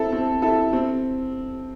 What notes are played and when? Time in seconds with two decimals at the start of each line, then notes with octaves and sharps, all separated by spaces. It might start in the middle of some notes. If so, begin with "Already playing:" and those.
Already playing: C4 E4 A4
0.12 C4
0.42 E4 A4
0.73 C4